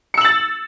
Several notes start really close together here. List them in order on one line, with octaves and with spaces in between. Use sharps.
C#7 E6 F#7 A6